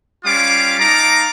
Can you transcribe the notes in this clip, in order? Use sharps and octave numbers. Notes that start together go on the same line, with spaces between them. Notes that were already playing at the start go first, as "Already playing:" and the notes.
G3 C#4 F4 F5 D6
D#4 F5 A5 A#5 D6